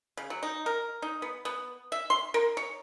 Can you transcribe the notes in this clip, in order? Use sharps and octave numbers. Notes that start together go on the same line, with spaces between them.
C#3
F#3
D#4
A#4
D#4
B3
B3
E5
C6
A#4
C#5